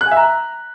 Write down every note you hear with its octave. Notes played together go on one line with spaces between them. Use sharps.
F#6
G#5
E5
A#5